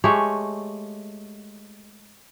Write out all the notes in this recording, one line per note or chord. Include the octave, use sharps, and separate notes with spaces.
G#3 A3 G4 C#5